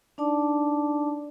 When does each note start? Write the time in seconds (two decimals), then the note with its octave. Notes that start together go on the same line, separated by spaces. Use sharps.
0.18 D4 D#4 D5 A5 D6